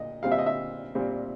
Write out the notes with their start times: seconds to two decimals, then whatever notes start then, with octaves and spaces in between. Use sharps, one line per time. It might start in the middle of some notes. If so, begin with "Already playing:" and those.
Already playing: A#2 D#5
0.23 A#2 G3 C4 F5
0.32 E5
0.38 D#5
0.46 E5
0.95 A#2 G3 C4